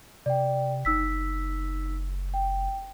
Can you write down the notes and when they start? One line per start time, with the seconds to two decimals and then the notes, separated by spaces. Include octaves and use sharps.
0.26 C3 D5 G5
0.85 F#1 D#4 E6 B6
2.34 G5